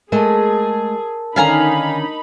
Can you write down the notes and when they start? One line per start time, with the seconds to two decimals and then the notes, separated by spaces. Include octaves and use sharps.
0.12 G#3 A3 G#4 A#4 D#5 A5
1.36 D3 D#3 C#4 D#4 F5 G#5 A#5 B5